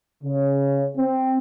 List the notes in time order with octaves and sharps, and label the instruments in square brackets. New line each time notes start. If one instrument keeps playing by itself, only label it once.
[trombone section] C#3
C4